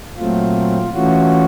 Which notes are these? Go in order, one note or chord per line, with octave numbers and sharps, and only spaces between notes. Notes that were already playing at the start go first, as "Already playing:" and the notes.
A#2 F#3 A3 C4 F4
E3 A3 C#4 F4 F#4